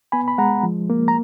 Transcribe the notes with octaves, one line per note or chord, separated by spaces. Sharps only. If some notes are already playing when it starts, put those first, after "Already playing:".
B3 G#5 B5
B5
G#3 F#5 A#5
F3
A#3
A#5